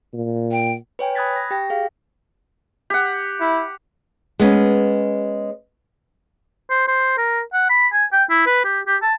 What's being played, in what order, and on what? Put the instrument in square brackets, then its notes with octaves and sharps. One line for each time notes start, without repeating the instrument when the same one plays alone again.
[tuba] A#2
[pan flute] G5
[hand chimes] B4 C#5 G5 G#5
B5 D#6 F#6 G#6 A6 B6
A#6
G4 G5 A#6
G#4 F5
[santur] G4 F#5
[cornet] E4
[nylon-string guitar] G#3 B3 C#4
[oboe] C5
C5
A#4
F#5
B5
G#5
G5
E4
B4
G4
G4
A5